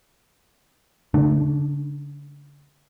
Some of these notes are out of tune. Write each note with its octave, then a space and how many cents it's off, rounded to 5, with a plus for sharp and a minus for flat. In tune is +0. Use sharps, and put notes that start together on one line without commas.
D3 -40 A3 +0 D4 +35